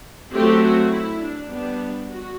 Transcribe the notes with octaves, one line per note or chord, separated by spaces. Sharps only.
F#3 A3 C4 G4
F#4
E4
D4
G3 B3 D4
F#4